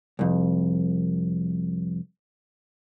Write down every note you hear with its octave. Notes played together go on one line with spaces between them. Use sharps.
C2 F2